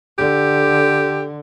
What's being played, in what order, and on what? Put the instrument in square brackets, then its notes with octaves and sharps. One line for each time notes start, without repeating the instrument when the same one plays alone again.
[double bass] D3 [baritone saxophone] G4